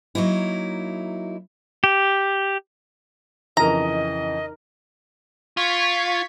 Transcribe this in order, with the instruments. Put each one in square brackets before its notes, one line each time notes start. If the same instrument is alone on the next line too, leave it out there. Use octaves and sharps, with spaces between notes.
[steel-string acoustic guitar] F#3 A#3 D#4 E4
[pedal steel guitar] G4
[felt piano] F2 C#3 E3 [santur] D#4 A#4 [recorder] D#5 [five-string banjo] A#5
[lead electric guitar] F4 [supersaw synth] C#6 G#6 B6